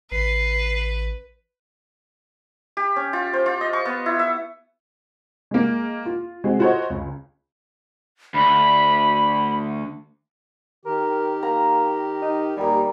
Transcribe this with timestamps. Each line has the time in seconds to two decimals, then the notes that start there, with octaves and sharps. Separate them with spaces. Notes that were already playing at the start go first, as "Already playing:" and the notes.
0.12 A1 B4 C7
2.77 G4
2.96 C#4
3.13 F4
3.33 C5
3.46 F4
3.61 D#5
3.73 C#6
3.85 B3
4.06 E4
4.19 E5
5.51 G#3 A#3
6.05 F4
6.44 G#3 C4 F#4
6.59 F4 F#4 A4 C5 C#5 D#5
6.90 C#2
8.34 D2 B5
10.85 D#3 G4 A#4
11.43 A#3 A#5
12.22 D#4
12.57 D#2 G3 A#3 D#4 G#5